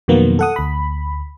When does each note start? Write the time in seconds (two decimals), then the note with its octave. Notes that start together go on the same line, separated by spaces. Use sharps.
0.08 F2 B2 D#3 F#3 A#3 B3
0.39 A4 F#5 D#6
0.56 D2 B5